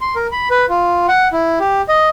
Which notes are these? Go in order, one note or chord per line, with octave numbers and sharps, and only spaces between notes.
C6
A#4
B5
B4
F4
F#5
E4
G4
D#5